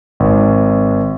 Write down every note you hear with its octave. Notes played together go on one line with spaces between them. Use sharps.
G#1